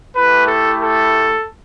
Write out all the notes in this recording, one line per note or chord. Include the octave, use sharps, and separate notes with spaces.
A3 E4 G4 B4
A4
A4